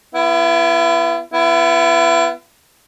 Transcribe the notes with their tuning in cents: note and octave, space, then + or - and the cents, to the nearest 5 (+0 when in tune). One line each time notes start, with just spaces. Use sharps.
B3 -10 E4 +35
B3 +0 E4 +35